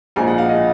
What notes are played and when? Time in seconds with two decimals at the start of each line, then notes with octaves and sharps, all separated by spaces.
0.16 A#1 A#2 G#3 G#5
0.27 F#5
0.38 F5
0.49 D#5